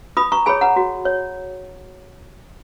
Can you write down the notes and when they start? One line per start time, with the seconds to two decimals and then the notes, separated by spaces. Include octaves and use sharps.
0.17 F4 B5 D#6
0.32 A#5 C#6
0.46 G#4 C#5 G#5 B5
0.61 F#5 A#5
0.76 F#4
1.05 C#5